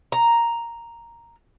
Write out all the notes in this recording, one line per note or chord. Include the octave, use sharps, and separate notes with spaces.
A#5